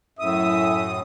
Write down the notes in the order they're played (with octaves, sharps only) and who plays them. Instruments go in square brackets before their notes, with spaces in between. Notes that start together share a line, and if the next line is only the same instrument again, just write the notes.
[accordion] F#2 A2 D#6 [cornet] E5